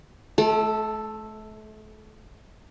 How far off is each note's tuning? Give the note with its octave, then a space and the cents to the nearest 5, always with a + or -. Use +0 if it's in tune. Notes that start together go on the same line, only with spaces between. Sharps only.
A3 -35 A4 +5